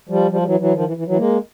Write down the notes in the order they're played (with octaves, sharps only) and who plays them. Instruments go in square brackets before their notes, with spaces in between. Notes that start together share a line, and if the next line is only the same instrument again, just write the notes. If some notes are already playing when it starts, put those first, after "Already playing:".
[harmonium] F3 G3
F3 G3
G3
E3 F#3
E3 F#3
D#3 F3
E3
E3
E3 F#3
G#3 A#3